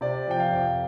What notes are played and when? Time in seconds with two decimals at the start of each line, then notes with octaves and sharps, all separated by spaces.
0.01 C3 D5
0.27 F3 G5
0.40 F5
0.53 F2